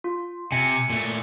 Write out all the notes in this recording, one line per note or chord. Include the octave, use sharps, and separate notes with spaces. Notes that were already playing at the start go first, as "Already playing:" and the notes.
F4
C3 G#5 C#7
A#2 A3